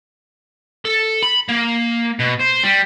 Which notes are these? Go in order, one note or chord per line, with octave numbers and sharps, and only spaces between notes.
A4
B5
A#3
B2
C5
G3